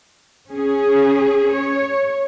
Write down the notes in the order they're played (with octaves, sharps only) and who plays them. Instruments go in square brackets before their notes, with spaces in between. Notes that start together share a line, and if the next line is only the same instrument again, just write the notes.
[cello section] C#4 G#4
C#5